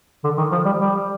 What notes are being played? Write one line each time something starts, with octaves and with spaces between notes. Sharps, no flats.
D3
D#3
F3
G3
G3